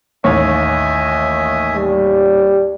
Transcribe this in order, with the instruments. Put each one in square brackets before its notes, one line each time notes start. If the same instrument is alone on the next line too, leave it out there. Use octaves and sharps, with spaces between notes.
[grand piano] A1 D#2 C#5 [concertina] D#5 E5 G#5
[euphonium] G3